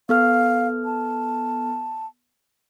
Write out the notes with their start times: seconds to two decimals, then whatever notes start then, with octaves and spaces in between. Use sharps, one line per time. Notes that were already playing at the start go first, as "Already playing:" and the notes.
0.09 B3 A4 F5 F6
0.85 A5